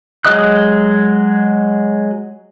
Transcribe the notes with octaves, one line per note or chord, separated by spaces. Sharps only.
F#3 G#3 D#5 D#6 F#6